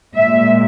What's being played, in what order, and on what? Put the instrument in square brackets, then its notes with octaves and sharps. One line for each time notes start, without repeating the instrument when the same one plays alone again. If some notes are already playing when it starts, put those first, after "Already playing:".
[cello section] A#2 G#3 E5